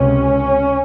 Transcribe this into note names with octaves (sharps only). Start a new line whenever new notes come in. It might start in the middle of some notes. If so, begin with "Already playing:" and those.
Already playing: C#2 C3 C#4